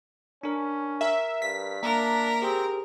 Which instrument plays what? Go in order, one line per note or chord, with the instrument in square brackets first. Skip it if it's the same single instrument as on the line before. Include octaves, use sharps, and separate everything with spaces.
[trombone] C#4 [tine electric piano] D4 A#4
[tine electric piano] A#4 [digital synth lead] E5
[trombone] G2 [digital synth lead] B6
[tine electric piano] A#3 E5 A#5 [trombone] D4 [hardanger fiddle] A#4
[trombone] C4 [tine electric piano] G4 G#4